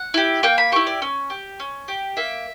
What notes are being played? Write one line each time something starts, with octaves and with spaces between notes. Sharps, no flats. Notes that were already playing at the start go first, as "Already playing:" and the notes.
Already playing: F#5
E4 G4
A#3 G5
B5
E4 G4 C#6
D5
C#4
G4
C#4
G4
A#3 E5